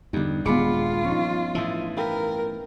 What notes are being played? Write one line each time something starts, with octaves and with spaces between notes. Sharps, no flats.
E2 G2 D3 B3 D4 D#4
D#1 G#3 B3 F4 G#4 B5 D6 C#7
F3 C#4 D#4
A2 E3 E5 A5 D#6
A#4 B4 F5 G5